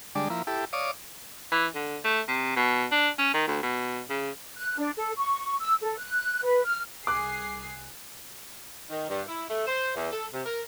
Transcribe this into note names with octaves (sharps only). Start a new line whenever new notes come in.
D3 G3 G#3 D4
F3 A#3 E4
E4 G4 A4
C#5 D5 F5 D6 D#6
E3
D3
A3
C3
B2
D4
C#4
D#3
D2
B2
C#3
F#6
D4
A4
C#6
E6
A4
F#6
B4
F6
C2 G#4 D6 F#6 C7
D#3
G2
E4
A3
C5
E2
A4
C3
A#4